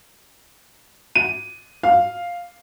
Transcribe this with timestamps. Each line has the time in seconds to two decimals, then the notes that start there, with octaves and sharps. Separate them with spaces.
1.15 D#7
1.83 F5